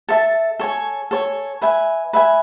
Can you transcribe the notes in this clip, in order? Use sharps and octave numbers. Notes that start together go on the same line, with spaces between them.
A4 E5 A5
A4 C#5 G#5
A4 C#5 G#5
B4 E5 G#5
B4 E5 G#5